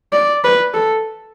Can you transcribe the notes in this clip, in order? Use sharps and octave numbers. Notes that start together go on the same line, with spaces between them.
D5
B4
A4